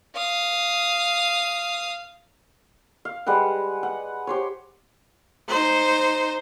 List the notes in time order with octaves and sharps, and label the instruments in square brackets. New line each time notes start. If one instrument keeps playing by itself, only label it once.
[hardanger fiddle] F5 D#6
[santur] F5
G3 G#3 B4 F#5
F#5
G4 C5 C#5
[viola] D#4 C5